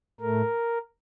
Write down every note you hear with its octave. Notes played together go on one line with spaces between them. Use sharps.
A2 A3 A#4